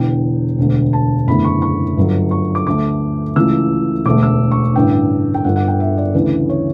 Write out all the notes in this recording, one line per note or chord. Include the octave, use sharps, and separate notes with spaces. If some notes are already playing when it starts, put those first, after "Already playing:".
Already playing: E1 E2 D3 G5
E1 D2 D3
A5
F#1 E2 D3 A3 B5
C#6
C#6
G1 G2 F#3
C#6
D6
D2 D3 A3 D6
C#2 C#3 E3 A3 E6
E1 D2 D3 A3 D6
E6
C#6
A1 G2 D3 G5
G5
G1 G2 D3 F#5
F#5
G5
E5
D5
D2 C#3 E3 B4
C#5